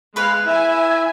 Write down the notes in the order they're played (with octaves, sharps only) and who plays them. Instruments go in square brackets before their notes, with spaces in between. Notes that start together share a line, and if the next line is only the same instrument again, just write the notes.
[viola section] G#3 F5 [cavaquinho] B4 B5
[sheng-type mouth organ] E4 [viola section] E5 G#5